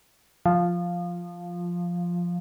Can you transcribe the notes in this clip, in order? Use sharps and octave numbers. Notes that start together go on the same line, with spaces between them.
F3